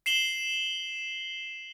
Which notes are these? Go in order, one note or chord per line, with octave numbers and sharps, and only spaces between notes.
C7 E7 F#7 G7